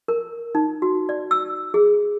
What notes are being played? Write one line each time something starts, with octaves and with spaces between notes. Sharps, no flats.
A#4
D#4
F#4
D5
E6
G#4